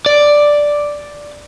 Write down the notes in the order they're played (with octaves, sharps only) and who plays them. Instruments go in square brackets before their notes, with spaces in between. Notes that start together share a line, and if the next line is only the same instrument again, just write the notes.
[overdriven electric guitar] D5